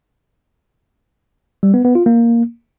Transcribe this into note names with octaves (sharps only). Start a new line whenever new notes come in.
G3
B3
B3
F4
A#3